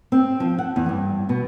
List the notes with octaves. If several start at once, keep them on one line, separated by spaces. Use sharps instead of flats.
C4
F3
F#5
E2
G2
B2